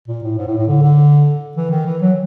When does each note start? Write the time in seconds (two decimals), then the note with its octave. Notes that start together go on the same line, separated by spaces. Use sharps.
0.08 A#2
0.23 A2
0.38 G#2
0.47 A2
0.58 A2
0.68 D3
0.82 D3
1.57 E3
1.71 D#3
1.86 E3
2.01 F#3